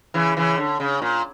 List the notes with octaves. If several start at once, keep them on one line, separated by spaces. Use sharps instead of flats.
C#3 E3
C#3 E3
D3
C#3
A#2